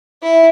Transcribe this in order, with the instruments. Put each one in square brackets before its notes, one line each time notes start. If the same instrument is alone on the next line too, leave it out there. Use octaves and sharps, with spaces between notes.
[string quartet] E4